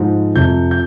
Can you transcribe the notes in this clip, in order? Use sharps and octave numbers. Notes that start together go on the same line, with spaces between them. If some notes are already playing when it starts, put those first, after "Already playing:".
Already playing: G#2 F3
F2 C3 F3 G6
G6